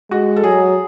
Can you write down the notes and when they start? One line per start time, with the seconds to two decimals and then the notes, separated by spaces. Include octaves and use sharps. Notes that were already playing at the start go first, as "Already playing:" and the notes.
0.11 G#3 F#4
0.36 A4
0.44 F#3 G#4